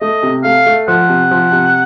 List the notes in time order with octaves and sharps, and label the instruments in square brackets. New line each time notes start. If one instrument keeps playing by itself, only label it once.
[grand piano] A3 [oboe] D#5
[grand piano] C3
[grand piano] A3 [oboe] F5
[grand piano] A3
[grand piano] F3 [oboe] F#5
[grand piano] C3
F3
C3